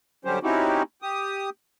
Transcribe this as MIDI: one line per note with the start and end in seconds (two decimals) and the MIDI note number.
0.25 0.39 50
0.25 0.39 54
0.25 0.39 55
0.25 0.39 61
0.25 0.39 67
0.25 0.39 72
0.43 0.83 60
0.43 0.83 61
0.43 0.83 63
0.43 0.83 64
0.43 0.83 66
0.43 0.83 67
1.02 1.50 67
1.02 1.50 87